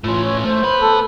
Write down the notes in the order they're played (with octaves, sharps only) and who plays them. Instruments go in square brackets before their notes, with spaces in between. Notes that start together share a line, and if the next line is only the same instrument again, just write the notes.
[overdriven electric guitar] A2 C#4 [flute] F4
[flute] C#5
[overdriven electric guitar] A3 [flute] C5
[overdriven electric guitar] B3 B5
[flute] A4